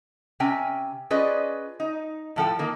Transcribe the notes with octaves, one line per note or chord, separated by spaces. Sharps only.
C3 C#4 G5 G#5
C#4 F4 G#4 B4 D5 D#5
D#4
A2 F3 A4 G5
D#3 A#3